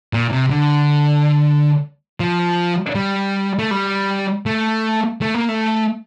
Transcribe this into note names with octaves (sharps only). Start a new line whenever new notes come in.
A#2
C3
D3
F3
G3
A3
G3
A3
A3
A#3
A3